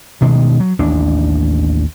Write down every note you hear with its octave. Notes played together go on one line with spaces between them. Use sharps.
D2 B2 D#3 G#3
F#3
A1 D#2 D4